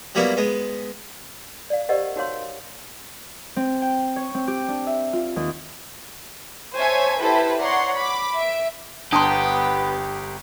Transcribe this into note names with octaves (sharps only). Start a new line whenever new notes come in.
F#3 G3 A#3 B3 E4 F#4
G#3 B3
D5 F5
G4 A#4 C5 D5 D#5 F#5
D#4 F#4 A#4 C#5 F5 C6
C4
G5
C#5
C4
G4
D4
E5
F4
D#2
C5 C#5 E5 G#5 A5
E4 G4 A4 B4 C5 E5
C#5 D5 F#5 A#5 C6
B5 D6
E5 D7
G1 B3 D4 G4 A5 A#5 C6 D#6